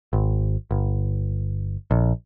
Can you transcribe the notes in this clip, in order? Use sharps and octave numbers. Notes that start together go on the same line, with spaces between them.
G#1
G1
A#1